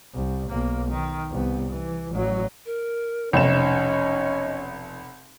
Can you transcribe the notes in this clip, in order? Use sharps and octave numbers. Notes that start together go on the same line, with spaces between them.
C2
B1 A#3
D#3
C2 B3
E3
A1 F#3
A#4
F1 B1 C#4 D#5 E7